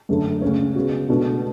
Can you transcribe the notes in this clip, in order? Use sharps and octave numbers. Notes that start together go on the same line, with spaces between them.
F#2 D3 A3
D2 C#3 G#3 C#4
C#3 G#3 B3 F#4
B2 A3 D4 F#4